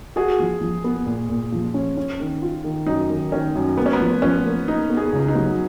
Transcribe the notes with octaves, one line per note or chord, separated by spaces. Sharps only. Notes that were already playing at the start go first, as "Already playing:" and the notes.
F#4 G#4
F3
F3
B3
A#2
A#2
F3
C#4
C#4
D#3
F4
D#3
F#2 D#4
D#3
D#3 C#4
F#2
A#3 B3
C#4
B3
F3
F3 C#4
A#3
B3 D#4
B3
G#4
C#2
D#4
F#3